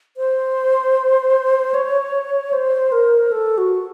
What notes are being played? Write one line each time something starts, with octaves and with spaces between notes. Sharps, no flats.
C5
C#5
C5
A#4
A4
F#4